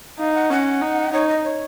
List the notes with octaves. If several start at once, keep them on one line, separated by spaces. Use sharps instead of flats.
D#4 F5
F#5
C#4 F#5
D#4
D#4 C#5
D#5
C#5